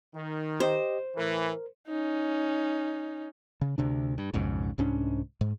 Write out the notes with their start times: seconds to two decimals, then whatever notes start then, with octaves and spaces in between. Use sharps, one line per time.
0.14 D#3
0.60 G4 C5 D#5
1.17 A2 E3 A#4
1.88 C#4 D#4
3.61 C#3
3.78 D2 C3 D4
4.18 G2
4.34 B1 F2 G#2 C#3
4.78 C2 G#2 C#4 D4
5.41 G#2